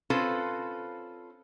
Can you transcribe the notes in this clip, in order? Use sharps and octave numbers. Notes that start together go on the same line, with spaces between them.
C4 C#4 F4 A4 B4 C5